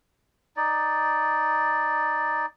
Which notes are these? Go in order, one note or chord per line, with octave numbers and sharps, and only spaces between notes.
D#4 D5